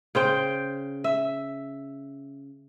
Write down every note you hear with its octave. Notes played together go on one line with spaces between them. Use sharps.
C#3 C5 G5
E5